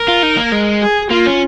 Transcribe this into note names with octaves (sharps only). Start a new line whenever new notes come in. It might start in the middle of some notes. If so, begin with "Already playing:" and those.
Already playing: A#4
F4
D#4
A#3
G#3
G#4
A#3 F4
C#4